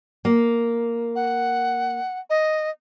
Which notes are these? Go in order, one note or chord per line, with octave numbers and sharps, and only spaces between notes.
A#3
F#5
D#5